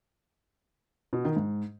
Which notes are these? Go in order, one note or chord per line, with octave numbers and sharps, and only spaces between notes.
B2
D#3
G#2